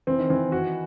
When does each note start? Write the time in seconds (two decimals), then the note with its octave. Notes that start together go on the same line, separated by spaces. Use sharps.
0.07 E3 C4
0.18 D#3
0.29 E3 C4
0.52 F#4